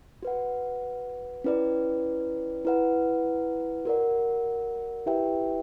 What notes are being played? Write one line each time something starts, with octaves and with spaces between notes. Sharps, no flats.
F#4 B4 F#5
C#4 E4 B4 D5
E4 B4 F#5
F#4 A#4 D5 F#5
E4 G4 B4 E5 G5